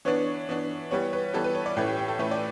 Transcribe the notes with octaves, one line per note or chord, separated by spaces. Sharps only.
E3 B3 D4 C#5
E3 B3 D4
E3 G3 B3 C#5
B4
E3 G3 B3 A4
B4
C#5
D5
A2 E3 A3 C#4
G4
G4
A4
A2 E3 A3 C#4 B4
D5